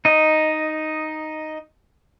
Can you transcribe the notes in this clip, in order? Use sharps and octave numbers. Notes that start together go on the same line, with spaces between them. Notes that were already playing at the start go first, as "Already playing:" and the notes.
D#4 D#5